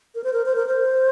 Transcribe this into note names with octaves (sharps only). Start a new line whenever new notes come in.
A#4
C5
A#4
C5
A#4
C5